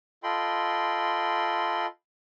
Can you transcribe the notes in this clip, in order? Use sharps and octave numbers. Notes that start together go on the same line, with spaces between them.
F4 A4 D#5 G5 B5 C6